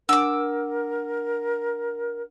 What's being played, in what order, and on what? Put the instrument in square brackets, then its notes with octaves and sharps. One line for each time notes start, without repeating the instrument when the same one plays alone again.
[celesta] D4 F#5 [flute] A#4 [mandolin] D6 E6